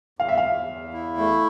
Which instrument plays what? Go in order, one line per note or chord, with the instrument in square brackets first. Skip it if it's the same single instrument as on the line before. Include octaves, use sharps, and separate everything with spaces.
[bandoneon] E2 [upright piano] F5
[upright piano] E5
F5
[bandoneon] E2
E2
E4
A3